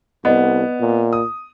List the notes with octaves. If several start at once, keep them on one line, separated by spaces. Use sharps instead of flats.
C2 B3 D5 D#5 F#5
A#2
D#6